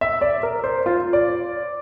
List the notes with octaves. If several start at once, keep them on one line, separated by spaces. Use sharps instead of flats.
E5
D5
A#4
C5
F4
D5